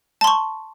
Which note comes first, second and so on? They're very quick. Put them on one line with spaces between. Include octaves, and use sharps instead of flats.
A5 C6 C#6